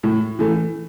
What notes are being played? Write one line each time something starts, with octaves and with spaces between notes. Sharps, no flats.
A2
E3 A3